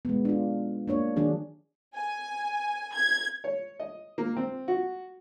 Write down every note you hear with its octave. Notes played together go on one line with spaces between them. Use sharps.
G#3 B3
D4 F4
A#3 D4 C#5
D#3 F#3 D4 G#4
G#5
G#6
C#5
D#5
A#3
C4
F#4